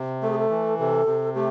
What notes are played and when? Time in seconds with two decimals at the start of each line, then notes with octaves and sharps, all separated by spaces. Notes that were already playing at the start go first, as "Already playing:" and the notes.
Already playing: C3
0.22 A3 A4
0.30 G#4
0.39 A4
0.50 E3
0.78 C3 A4
1.06 C3
1.35 A3 G4